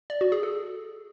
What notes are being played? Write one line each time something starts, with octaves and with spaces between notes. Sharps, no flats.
D5
F#4
G#4
A4